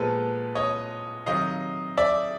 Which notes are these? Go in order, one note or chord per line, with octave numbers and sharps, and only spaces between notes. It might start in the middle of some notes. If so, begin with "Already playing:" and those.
Already playing: A#2 F3 G#3 B3 A4 B4
C#5 D#5
C3 D#3 F#3 D#5 F5
D5 E5